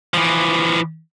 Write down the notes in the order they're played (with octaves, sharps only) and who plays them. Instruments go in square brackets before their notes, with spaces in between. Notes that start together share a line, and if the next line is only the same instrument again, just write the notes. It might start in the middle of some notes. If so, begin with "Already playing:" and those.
[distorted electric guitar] E3 F3